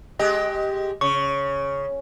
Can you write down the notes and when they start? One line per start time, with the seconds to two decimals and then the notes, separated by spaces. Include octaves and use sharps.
0.19 G#3 G4 D#5
1.01 C#3 C#6